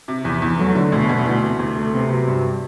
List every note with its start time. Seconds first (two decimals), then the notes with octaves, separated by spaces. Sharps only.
0.08 C3
0.24 E2 E3
0.42 E2
0.59 F#3 A3
0.75 D3
0.92 D2 B2
1.09 D2
1.26 E3
1.43 C3
1.59 D2
1.76 A3
1.93 C3 B3
2.10 F#3
2.28 G2